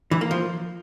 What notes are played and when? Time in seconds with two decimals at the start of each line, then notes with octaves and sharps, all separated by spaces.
0.11 E3
0.21 A#3
0.31 F3